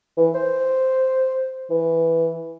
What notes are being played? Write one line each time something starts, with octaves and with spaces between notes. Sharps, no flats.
E3
C5
E3